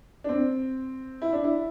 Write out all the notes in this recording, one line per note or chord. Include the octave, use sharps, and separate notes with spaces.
D4
C4
E4
D4
E4